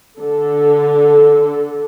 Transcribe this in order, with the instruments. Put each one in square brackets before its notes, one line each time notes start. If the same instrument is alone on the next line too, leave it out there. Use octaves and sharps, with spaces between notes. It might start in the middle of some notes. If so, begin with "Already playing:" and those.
[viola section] D3 A4